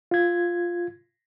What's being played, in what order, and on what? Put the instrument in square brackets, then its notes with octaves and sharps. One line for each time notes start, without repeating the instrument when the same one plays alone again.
[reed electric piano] F4 G#6